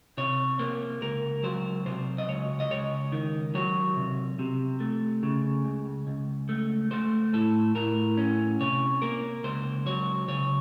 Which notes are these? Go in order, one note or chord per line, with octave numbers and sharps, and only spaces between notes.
C3 C#5
A#3 C5
C#2 A#4
F#3 C5
C3 C5
D#5
C#2 C#5
D#5
C#2 C#5
D#3
F#3 C#5
C3
C3
A3
C#3
C#2
C#2
A3
A3 C5
A2 A4
A2 A#4
C#4
C3 C#5
A#3 A#4
C#2 C5
F#3 C#5
C#3 C#5